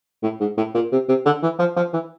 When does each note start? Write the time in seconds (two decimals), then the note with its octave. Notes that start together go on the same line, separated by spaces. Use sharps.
0.23 A2
0.41 G#2
0.57 A2
0.74 A#2
0.92 C3
1.09 C3
1.25 D3
1.43 E3
1.59 F3
1.76 F3
1.93 E3